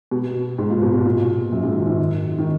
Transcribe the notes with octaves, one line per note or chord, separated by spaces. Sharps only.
B2
G#2
A#2
B2
B2
A#2
F#2
G#2
D#3
D#3
D#3